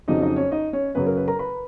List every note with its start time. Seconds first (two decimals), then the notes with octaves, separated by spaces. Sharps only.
0.08 F2 C#3 F#3 D#4 D#5
0.22 D#4 D#5
0.36 C#4 C#5
0.51 D#4 D#5
0.73 C#4 C#5
0.95 F#2 C#3 F#3 B4
1.07 A#4
1.17 B4
1.28 A#4 A#5
1.39 B4 B5